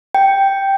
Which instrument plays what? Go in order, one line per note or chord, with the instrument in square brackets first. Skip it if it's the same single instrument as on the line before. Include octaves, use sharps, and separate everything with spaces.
[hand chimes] G5